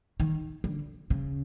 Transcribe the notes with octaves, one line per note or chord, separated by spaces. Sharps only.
D#3
D3
C#3